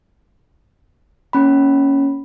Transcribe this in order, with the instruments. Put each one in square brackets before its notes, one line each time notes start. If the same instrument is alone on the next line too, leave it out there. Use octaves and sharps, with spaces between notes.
[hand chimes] A#3 C#4 B5